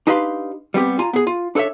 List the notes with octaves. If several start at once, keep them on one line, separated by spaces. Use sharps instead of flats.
D4 D#4 G4 B4 F5 C6
G3 B3 C4 G4
F4 G#5 A#5
B3 G#4
F4
D4 A4 B4 C#5 E5